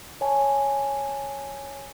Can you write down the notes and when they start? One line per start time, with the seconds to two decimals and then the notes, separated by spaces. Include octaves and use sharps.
0.21 C#5 G#5 A5